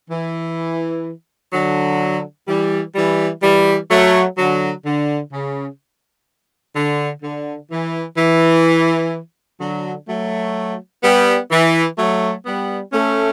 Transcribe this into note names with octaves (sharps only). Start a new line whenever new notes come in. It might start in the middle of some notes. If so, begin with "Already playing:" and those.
E3
D3 F#3
E3 G3
E3 G3
E3 G3
F#3 A3
D3 F#3
D3
C#3
D3
D3
E3
E3
D3 F#3
F#3 A3
G3 B3
E3
F#3 A3
G3 B3
A3 C#4